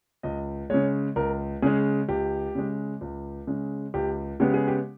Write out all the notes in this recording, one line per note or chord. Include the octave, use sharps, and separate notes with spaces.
C#2 D#5
C#3 G#3 C#5
C#2 A#4
C#3 G#3 G#4
C#2 G4
C#3 G#3
C#2
C#3 G#3
C#2 G4
C#3 G#3 B3 G4
G#4
G4